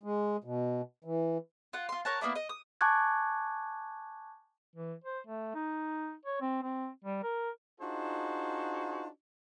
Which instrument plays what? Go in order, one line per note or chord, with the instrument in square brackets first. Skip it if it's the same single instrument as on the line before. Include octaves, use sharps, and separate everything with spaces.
[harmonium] G#3
B2
E3
[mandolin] F4 F#5
F4 C6
A#4 C#5 F#5 A5
A#3 B3 E4 D5
D#5
D#6
[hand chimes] G#5 A5 C#6 D6 F#6 G#6
[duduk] E3
C5
A3
D#4
C#5
C4
C4
G3
A#4
[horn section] D4 D#4 F4 F#4 G#4 C5